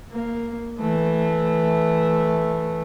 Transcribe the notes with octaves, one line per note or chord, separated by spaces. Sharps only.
A#3
E3 A3